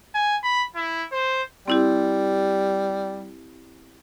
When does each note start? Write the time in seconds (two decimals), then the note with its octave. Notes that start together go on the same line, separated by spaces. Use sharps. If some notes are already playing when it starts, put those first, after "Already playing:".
0.14 G#5
0.43 B5
0.76 E4
1.12 C5
1.68 G3 C4 E4 G4